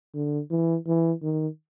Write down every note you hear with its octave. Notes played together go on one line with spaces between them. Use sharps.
D3
E3
E3
D#3